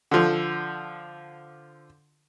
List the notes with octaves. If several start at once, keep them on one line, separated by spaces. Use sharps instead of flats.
D3 F3